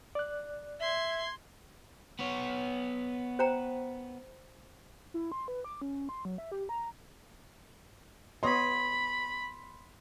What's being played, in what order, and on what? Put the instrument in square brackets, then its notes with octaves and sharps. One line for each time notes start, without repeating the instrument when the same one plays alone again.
[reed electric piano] D5 F#6
[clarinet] E5 [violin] C6 G#6
[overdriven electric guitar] B3 C#5
[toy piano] C5 G5 A#5
[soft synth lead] E4
C6
B4
D6
C#4
C6
F#3
E5
G4
A#5
[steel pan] B3 C#5 D#5 [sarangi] B5 [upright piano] C6